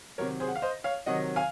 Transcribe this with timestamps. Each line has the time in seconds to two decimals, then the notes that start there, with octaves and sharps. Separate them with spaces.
0.18 C3 D#3 F#3 A#4 C#5
0.40 G#4 C5
0.48 F#5
0.55 F5
0.62 C5 D#5
0.84 C#5 F5
1.06 C3 D#3 F#3 D#5 F#5
1.36 F5 G#5